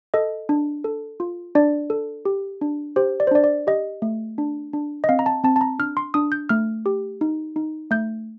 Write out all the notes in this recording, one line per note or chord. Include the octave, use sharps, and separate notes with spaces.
A4 D#5
D4
A4
F4
D4 D5
A4
G4
D4
G4 C5
D5
C5
D4 D5
D5
G4 D#5
A3
D4
D4
D#5
C4 F5
A#5
A5
C4 A5
A5
A#5
D4 F6
C6
D4 D#6
G6
A3 F6
G4
D#4
D#4
A3 G6